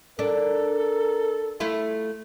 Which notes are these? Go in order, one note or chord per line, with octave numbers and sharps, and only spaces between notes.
D4 A4 A#4
A3 E4 F4